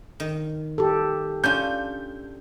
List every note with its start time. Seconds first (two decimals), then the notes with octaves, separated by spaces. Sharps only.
0.20 D#3
0.78 G4 A4
1.44 C#4 D4 F4 G6